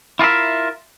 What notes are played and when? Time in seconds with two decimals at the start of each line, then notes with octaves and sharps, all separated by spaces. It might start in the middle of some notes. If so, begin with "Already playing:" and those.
0.19 E4 F4 G#4 A#4 E5